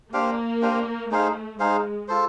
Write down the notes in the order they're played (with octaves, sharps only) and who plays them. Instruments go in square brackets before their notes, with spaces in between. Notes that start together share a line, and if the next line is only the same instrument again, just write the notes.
[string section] A#3 [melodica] D4 G4 C5 F5
[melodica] D4 G4 C5 F5
[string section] A3 [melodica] D#4 G#4 C5 F5
[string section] G#3 [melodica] D#4 G#4 C5 F5
[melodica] F4 A4 C5